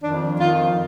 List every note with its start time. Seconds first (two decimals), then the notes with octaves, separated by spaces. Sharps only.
0.01 F2 D#3 D4
0.39 F2 D#3 F4